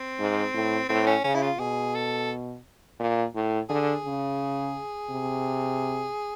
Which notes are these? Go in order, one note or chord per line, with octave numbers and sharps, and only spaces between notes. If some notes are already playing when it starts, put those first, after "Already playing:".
Already playing: C4
G#2
A2
A2 C4
C#4
C#3 C#4
E4
F4
B2 G#4
A4
A#2
A2
D3 G#4
C#3
C3